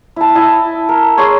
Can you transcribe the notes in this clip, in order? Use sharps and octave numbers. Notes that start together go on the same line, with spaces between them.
E4 A5
E4 D#5 G#5 A5
A#4
G#4 C#5 D#5 C6